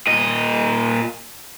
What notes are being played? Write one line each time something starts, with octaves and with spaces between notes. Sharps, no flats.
A#2 D#5